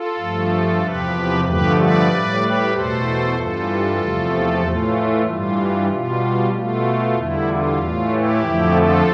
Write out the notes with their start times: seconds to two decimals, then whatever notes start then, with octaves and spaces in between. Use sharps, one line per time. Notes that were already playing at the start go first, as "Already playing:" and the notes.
Already playing: F4 A4
0.18 G2 F3 A3
0.81 E2 C3 F3 G4 B4
1.45 G2 D3 F3 A3 G4 B4
1.77 B4 D5
2.08 A2 G3
2.40 G4 B4
2.72 E2 B2 A3 A4 C5
3.35 G2 E3 G3 F4 A4
3.98 E2 C3 F3 A3
4.62 A2 E3 A3 F4
5.26 G2 E3 G3 F4
5.89 B2 G3 F4
6.52 B2 A3 F4
7.16 E2 D3 G3 E4
7.48 F4
7.79 A2 E3 A3
8.11 E4 G4
8.42 F2 D3 F3 A3
8.74 F4 A4